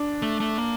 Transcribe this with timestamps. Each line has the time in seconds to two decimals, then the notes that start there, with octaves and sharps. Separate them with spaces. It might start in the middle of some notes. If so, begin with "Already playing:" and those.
Already playing: D4
0.22 A3
0.40 A3
0.58 A#3